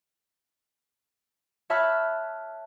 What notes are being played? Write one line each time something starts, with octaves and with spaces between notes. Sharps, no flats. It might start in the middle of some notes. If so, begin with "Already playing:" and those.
C#5 E5 A5 B5 F6 F#6